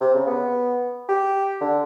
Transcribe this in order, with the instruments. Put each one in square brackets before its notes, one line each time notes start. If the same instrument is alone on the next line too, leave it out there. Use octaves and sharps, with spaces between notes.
[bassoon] C3
C#3
B3
G4
D3